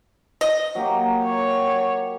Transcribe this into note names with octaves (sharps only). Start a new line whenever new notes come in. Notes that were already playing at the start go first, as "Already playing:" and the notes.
D#5
F#3 A#3 G4
C#5